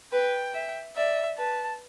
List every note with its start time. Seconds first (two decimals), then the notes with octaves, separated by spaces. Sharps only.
0.12 B4 G5
0.54 E5
0.96 D5 E5
1.38 B4 A5